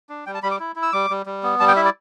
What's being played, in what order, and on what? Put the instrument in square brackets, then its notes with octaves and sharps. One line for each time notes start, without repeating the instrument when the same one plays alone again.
[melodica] D4
G3 G5
A5
G3 B5
D6
E4
E4
E6
G3 D6
G3
G3
B3
G3 A5
G5
E4 E5
D5